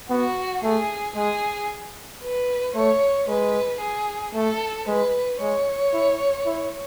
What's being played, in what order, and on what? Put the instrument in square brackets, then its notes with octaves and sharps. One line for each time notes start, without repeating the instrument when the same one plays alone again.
[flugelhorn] B3 [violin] F#4
[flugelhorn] A3 [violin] G#4
[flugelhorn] G#3 [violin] G#4
[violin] B4
[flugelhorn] A3 [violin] C#5
[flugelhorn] G#3 [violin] B4
[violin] G#4
[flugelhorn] A3 [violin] A4
[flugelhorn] G#3 [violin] B4
[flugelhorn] G#3 [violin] C#5
[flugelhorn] E4
E4